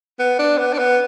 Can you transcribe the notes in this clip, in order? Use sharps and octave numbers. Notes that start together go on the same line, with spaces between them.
B3
D4
B3
D4
B3